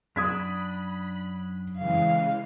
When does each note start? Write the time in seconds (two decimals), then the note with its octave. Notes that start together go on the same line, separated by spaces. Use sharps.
0.16 F#2 D4 B5 D#6 G#6 B6
1.78 C#3 E3 G#3 F5